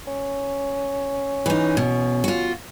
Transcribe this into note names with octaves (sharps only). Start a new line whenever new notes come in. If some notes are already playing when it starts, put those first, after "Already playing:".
C#4
E3 D#4
B2
F4 F#4